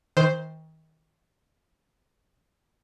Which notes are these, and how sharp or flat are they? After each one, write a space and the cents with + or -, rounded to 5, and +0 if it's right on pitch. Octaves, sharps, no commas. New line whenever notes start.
D#3 +35 C5 +0